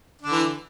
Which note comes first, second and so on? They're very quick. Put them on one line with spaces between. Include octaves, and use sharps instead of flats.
D4 D3 E3